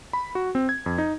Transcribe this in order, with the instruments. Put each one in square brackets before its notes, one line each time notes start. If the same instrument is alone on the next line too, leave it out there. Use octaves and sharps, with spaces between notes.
[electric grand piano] B5
F#4
C4
G#6
F2
D#4